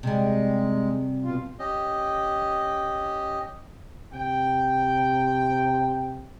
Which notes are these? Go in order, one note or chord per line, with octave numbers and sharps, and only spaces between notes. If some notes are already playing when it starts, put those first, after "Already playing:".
C3 G3 G#3
B2 F4
C#4 G4 D#5
C3 G5